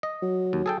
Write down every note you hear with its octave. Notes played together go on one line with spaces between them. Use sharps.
D#5
F#3
D#2
G#4 A4 G5